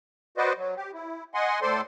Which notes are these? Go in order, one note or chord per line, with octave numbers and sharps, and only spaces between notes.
F#4 B4 C5 D5 D#5
F#3
G4
E4
D#5 F#5 G#5 C6
A2 A4 C5 D5 C6